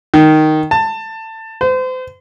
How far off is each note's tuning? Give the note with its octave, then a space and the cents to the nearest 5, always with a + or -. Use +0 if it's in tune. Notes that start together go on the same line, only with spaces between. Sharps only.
D#3 -5
A5 +20
C5 -35